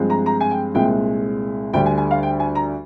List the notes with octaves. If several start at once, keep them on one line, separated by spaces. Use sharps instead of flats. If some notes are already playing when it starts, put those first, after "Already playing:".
Already playing: G2 F3 G#3 C4
A#5
A#5
G#5
G5
C2 A#2 G#3 C4 G5
D2 D3 G3 G5
G#5
G#5
F5
G5
G#5
A#5